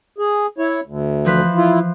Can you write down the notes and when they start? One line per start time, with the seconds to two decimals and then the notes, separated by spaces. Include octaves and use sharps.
0.18 G#4
0.58 E4 C#5
0.86 D2
1.25 E3 F3 B4
1.56 E4 F4